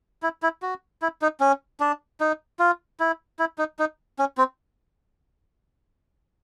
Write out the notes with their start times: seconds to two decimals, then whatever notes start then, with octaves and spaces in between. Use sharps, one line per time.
0.23 E4
0.42 E4
0.62 F#4
1.02 E4
1.22 D#4
1.40 C#4
1.80 D4
2.20 D#4
2.59 F4
3.00 E4
3.39 E4
3.58 D#4
3.79 D#4
4.19 C#4
4.38 C4